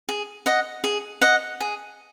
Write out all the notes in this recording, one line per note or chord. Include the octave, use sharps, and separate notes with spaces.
G#4
D#5 F#5
G#4
D#5 F#5
G#4